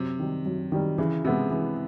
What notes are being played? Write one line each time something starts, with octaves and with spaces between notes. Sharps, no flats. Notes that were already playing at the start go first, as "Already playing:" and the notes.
Already playing: F#2 C3
D#3 G3
F#2
D#3 G3
C#3 E3
C3 G#3 B3 E4
E3